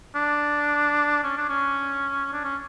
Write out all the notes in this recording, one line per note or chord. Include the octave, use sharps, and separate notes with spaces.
D4
C#4
D4
C#4
D4
C#4